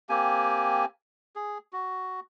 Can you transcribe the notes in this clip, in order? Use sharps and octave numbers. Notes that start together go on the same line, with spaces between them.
A#3 C4 G4 G#5
G#4
F#4